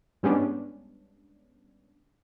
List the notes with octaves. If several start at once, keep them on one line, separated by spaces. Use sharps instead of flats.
G#2 G3 G#3 B3 C#4 D4